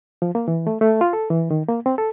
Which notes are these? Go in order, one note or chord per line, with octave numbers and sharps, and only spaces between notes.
F3
A#3
E3
A3
A3
F4
A4
E3
D#3
A#3
C4
A4